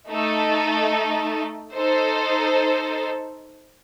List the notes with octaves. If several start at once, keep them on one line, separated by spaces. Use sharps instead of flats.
A3 D#4 A4
D#4 A4 C5